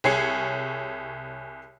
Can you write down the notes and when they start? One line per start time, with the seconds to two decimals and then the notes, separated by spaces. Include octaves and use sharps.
0.04 C2 G#4 C#5 C7 C#7